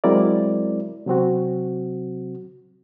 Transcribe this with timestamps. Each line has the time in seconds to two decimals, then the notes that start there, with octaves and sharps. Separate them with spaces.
0.04 F#3 G#3 C4 E4 A#4 D5
1.06 C3 F#3 C4 F#4